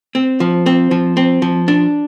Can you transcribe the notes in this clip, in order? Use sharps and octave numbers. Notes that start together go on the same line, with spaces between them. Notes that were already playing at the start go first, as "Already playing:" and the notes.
C4
F3
C4
F3
C4
F3
D4